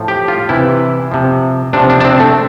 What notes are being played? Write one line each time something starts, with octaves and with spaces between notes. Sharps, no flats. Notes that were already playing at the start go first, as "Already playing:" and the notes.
Already playing: A2 F3
G4
F4
C3 E3 E4
C3 F3
C3 F3 D4
D4
D4
C4
A3